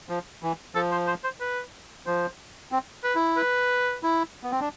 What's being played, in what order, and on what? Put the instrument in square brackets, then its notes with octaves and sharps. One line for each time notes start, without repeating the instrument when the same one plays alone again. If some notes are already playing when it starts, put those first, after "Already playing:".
[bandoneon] F3
E3
[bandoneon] F3 [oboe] A4
[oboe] C5
C5
C5
B4
[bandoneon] F3 [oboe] C5
[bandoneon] C4
[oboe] B4
[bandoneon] E4
[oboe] B4
[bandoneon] E4
B3
C4
D4